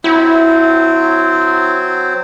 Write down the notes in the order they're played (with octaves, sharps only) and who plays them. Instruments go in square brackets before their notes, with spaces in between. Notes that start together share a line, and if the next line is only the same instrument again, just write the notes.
[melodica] F#3 C4 C5 [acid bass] E4